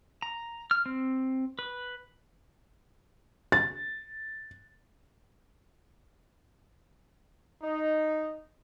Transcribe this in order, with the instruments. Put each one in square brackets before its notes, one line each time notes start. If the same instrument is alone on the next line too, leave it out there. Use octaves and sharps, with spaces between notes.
[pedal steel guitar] A#5
F6
C4
B4
[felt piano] A6
[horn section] D#4